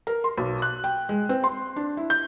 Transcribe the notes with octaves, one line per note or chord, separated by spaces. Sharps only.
A#4
C6
B1
F#6
G5
G#3
C4
C6
D4
E4
G6